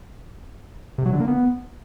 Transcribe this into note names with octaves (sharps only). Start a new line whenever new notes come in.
C3
F#3
D3
A#3
B3